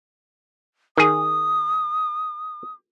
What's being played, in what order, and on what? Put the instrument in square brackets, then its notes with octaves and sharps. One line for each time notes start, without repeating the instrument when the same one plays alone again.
[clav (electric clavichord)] D#3 G#4 [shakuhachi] D#6